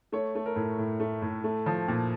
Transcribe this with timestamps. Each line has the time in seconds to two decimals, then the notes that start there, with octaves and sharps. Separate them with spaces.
0.12 A3 C#5
0.35 A3
0.46 A#4
0.56 A2
0.79 A2
1.00 A3
1.22 A2
1.44 A3
1.66 F3
1.88 A#2